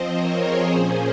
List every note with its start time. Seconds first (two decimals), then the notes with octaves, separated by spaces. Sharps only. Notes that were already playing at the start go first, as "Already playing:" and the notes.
Already playing: F3 C4 C5 D#5
0.12 A#4 C#5
0.40 G#4 C5
0.70 A#2 F3 A#3 C#4